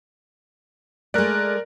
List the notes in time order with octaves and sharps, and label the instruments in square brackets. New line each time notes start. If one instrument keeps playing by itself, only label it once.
[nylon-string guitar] G#3 A3 [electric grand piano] A#4 D5 [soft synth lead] F#6